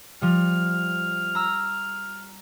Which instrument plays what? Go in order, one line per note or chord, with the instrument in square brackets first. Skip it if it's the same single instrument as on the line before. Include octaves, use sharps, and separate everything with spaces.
[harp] F3 G3 [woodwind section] F6
[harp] A#5 E6